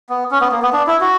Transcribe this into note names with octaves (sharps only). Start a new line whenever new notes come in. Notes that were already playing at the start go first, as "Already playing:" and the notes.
B3
C#4
B3
A#3
B3
D4
E4
F#4